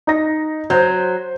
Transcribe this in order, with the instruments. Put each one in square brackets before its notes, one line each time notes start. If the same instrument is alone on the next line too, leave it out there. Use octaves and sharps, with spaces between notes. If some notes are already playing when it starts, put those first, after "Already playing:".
[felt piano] D#4 A#6
[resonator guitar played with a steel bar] F#3 [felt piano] C5 G6